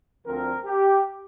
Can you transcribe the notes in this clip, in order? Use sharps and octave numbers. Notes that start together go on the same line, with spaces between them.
D2 D3 F3 C4 A#4
G4